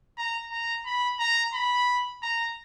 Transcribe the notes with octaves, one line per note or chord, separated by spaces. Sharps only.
A#5
A#5
B5
A#5
B5
A#5